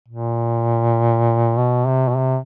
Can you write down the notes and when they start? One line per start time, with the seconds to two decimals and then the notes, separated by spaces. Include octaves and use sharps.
0.08 A#2
1.57 B2
1.87 C3
2.09 B2
2.17 C3